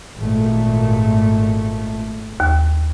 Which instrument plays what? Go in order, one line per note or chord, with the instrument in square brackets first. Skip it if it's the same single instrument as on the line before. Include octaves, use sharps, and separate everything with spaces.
[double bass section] G#1 A#2 A3
[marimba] D#2